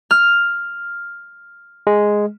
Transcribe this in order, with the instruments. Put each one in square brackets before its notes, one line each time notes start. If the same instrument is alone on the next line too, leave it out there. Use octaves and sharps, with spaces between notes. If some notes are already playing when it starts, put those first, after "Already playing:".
[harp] F6
[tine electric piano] G#3